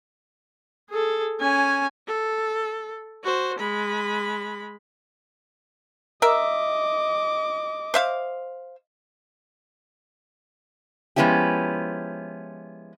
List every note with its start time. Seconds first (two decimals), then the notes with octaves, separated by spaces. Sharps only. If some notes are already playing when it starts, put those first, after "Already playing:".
0.91 G#4 A4
1.40 C#4 G#5
2.08 A4
3.24 F#4 C5
3.59 G#3 B5
6.22 A#4 D#5 E5 D6
7.94 C5 E5 F5
11.16 F3 G#3 B3 C#4 E4 G4